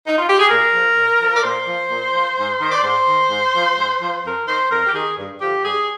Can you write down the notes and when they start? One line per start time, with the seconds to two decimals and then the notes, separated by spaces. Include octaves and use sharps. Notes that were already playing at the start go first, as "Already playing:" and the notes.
0.07 D#4
0.18 F4
0.28 G4
0.39 G#4
0.49 A#2 A#4
0.73 F3
0.96 A#2
1.20 F3
1.35 D5
1.44 A#2 C5
1.67 F3
1.90 A#2
2.13 F3
2.38 G#2
2.61 D#3
2.71 D5
2.84 G#2 C5
3.07 D#3
3.30 G#2
3.54 F3
3.77 G#2
4.01 F3
4.24 F2 A#4
4.47 D#3 C5
4.71 F2 A#4
4.86 G4
4.94 D#3 G#4
5.18 G2
5.41 D3 F3 G4
5.65 G2 G#4